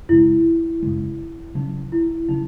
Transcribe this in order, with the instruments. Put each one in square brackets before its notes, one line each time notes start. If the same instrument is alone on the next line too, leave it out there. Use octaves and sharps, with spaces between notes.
[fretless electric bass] F#2 C#3 G#3 [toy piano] E4
[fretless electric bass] F#2 C#3 G#3
[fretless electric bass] C#3 F#3 C#4 [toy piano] D#4
[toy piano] E4
[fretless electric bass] C#3 F#3 C#4 [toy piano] D#4